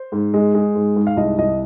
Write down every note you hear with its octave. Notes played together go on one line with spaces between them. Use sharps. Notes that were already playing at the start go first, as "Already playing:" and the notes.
Already playing: C5
G#2
G#3
G#3
G#2
G#2
F5
C2 D#5
C2 D#5